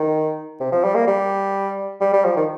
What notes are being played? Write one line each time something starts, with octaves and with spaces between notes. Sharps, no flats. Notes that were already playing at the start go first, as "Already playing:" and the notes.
Already playing: D#3
C3
F3
G3
A#3
G3
G3
G3
F3
D#3